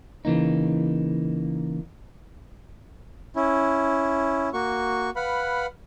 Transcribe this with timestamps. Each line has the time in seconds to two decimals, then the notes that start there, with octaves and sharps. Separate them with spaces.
0.25 C#3 E3 A#3 D#4
3.36 C#4 E4
4.53 A#3 F#4 C#6
5.16 B4 F5 F#5 B5